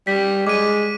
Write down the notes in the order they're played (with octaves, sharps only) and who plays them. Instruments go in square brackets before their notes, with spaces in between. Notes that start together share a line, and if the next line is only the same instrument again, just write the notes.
[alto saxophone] G3 [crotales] B6
[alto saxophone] G#3 [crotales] D6 D#7